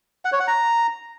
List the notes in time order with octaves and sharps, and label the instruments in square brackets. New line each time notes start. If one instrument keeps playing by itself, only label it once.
[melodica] F#5
C#5
F#5
A#5